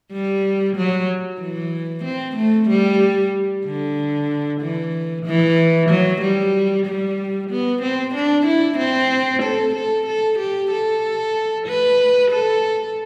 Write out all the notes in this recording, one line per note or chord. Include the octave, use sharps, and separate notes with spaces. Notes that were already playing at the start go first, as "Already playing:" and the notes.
G3
F#3
E3
C4
A3
G3
D3
E3
E3
F#3
G3
G3
B3
C4
D4
E4
C4
A4
A4
A4
G4
A4
B4
A4